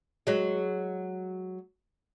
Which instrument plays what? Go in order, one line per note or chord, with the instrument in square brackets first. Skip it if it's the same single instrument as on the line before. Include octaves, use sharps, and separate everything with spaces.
[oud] F#3 G#3